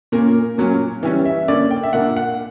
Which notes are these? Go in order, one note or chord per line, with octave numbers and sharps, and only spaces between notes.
A#2 A#3 C#4 A#4
A#2 F#3 C#4
E3 G3 C#4
E5
D3 A#3 C#4 D5
G5
E5
A#2 A#3 D4 F#5
F#5